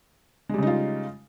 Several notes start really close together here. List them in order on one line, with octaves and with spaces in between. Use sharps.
G#3 G3 C#3 D#4 F4